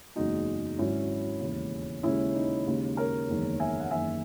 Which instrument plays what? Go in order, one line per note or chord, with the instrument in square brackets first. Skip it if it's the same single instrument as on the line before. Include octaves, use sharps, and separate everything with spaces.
[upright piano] F#1 E2 C#3 G#3 D#4 F#4
G#1 G#2 F#3 C#4 E4
E1 D#2 C#3
D#2 C#3 G#3 C#4 E4
D#4
D#2 C#3 G#3
A#4 C#5
F#1 E2 D#3 G#3
E5 G#5
F#5
F#1 E2 D#3 E5 G#5